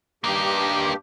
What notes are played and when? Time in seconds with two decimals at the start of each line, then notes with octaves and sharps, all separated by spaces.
0.24 G2 A#3 D#4 G4